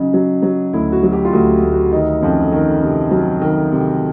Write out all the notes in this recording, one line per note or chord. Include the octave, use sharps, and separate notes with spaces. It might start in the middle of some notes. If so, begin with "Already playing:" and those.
Already playing: C#3 F#3 D#4
F#3
F#3
D2 E4
F#4
F#3
G4
F4
D2 F#4
D2
F#4
D#3 D#4
F2 C#4
D#3
C3
F#3
D#3
C3